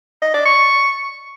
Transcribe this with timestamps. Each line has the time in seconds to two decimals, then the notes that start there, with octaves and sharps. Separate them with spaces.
0.22 D#5
0.34 D5
0.45 C#6